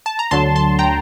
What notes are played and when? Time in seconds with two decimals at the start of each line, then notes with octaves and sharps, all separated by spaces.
0.06 A5
0.19 A#5
0.31 D2 D3 F#3 A5 C6
0.55 A5 C6
0.79 G5 A#5